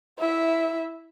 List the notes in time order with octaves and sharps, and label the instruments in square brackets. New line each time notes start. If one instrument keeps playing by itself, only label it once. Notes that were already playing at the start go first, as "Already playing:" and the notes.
[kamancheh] E4 E5